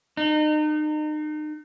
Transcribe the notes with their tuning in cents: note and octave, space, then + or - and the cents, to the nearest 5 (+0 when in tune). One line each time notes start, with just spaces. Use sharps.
D#4 -35